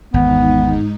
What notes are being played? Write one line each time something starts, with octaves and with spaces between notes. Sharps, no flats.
G#1 E2 G#2 B3 D#4